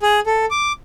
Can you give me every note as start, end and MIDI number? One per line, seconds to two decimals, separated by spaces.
0.03 0.20 68
0.27 0.45 69
0.51 0.72 86